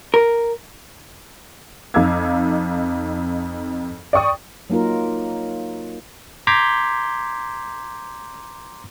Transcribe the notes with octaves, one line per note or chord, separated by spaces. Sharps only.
A#4
F2 D#4 F5 D6 E6 G#6
D5 G5 C#6 D#6
F#3 A#3 D#4 F4 A#4
A#5 C6 D6 G6 G#6 B6